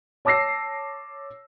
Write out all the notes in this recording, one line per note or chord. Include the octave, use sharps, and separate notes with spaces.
C#5 A5 D6 E6 A#6 C7